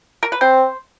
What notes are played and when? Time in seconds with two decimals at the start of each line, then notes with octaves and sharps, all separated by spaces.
0.23 A#4
0.32 B4
0.41 C4 C5